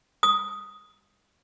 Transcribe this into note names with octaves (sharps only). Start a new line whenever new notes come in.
D#6